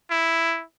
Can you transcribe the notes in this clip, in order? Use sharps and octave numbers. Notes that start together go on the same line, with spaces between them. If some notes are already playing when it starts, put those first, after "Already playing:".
E4